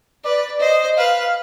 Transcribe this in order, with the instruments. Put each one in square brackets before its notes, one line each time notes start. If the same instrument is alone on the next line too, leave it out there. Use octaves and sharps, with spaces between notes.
[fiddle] B4 [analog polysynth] D5
[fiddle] C5 [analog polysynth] D#5
[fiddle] B4 [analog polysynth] F5